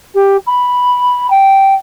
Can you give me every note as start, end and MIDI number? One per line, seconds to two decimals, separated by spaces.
0.14 0.37 67
0.46 1.30 83
1.30 1.75 79